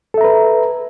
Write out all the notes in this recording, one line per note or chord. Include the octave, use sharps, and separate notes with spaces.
A4 B4 E5 A#5